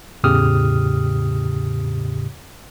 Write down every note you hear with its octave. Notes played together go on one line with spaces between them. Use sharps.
E2 A2 C#3 G4 D#6 F6